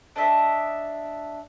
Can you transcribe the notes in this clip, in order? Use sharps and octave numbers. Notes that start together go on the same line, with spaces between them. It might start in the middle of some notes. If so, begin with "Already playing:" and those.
D4 D#5 E5